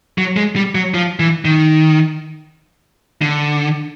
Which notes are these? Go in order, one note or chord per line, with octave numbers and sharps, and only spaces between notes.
F#3
G#3
G3
F#3
F3
E3
D#3
D3